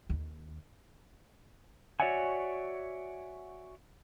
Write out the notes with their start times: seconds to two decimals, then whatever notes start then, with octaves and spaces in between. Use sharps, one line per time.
0.09 D#2
2.00 F#4 C#5 D5 E5 F#5 G#5